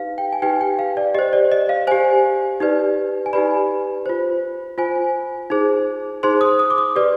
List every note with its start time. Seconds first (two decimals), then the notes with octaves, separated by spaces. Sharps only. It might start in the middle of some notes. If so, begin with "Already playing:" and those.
Already playing: D#4 G4 B4 F5
0.18 G5
0.33 G#5
0.42 D#4 G4 B4 G5
0.61 G5
0.79 F5
0.97 D5
1.15 G4 C5 D#5
1.33 D5
1.52 D#5
1.69 F5
1.87 G4 C5 G#5
2.60 D#4 G4 B4 D5
3.26 G#5
3.33 D#4 G4 B4 D5 B5
4.06 F4 C5
4.78 F4 C5 G#5
5.50 D#4 G#4 C5
6.23 D#4 G#4 C5 C6
6.41 D#6
6.59 D#6
6.70 D6
6.78 D#6
6.96 G4 B4 D5